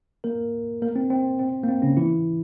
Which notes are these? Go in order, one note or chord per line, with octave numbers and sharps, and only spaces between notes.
A#3 A#4
A#3 A#4
C4
C4
C4
A#3
C4
C#3 C#4
E3 E4